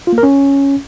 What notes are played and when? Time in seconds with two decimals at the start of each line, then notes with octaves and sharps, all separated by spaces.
0.07 F4
0.13 A#3
0.18 A#4
0.23 C#4